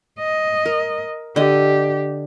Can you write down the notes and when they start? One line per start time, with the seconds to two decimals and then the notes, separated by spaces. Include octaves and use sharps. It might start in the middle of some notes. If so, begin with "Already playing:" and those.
0.19 D#5
0.66 A#4
1.36 D3 G4 D#5